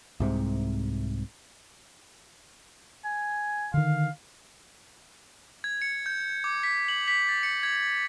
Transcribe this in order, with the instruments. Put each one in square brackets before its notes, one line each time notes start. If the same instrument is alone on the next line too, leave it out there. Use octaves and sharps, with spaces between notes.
[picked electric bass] C2 G#2 C3
[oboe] G#5
[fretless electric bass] D3 D#3 [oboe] F5
[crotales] G#6
C#7
G6
D6
B6
F#7
B6
A6
C#7
G#6